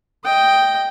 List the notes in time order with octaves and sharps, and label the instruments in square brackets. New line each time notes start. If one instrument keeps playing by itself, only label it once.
[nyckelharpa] D#5 G5